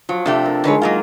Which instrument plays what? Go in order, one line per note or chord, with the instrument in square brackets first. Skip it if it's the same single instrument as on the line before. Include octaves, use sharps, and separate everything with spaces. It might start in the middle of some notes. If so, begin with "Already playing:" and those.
[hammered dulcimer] F3 [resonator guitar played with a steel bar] F#3
[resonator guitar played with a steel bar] C3 A3 G4 [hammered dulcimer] D4
[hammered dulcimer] A#4
[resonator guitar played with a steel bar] D3 B4 C#5 [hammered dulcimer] D#3 G#3
[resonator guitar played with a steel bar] F#3 A#3 F4